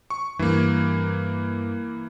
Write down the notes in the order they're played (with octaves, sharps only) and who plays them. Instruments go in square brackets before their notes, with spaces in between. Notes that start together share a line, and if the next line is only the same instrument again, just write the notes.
[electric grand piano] C#6
[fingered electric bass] G2 [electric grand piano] E3 A#3